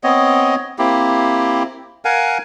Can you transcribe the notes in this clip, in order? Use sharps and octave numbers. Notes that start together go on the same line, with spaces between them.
B3 C4 C#5 D#5
A#3 C4 E4 G4
A#4 F5 F#5 G#5